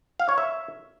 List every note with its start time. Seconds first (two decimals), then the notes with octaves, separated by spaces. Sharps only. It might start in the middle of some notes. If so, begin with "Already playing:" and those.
0.20 F5
0.29 C#5
0.38 E5